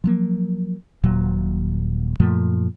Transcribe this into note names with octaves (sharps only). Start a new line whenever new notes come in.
F3 F#3 A#3
D#1 A#2 F#3
F#2 A#2 F3 A3